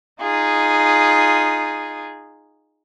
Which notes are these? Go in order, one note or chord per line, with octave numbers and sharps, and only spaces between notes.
D#4 F4 G#4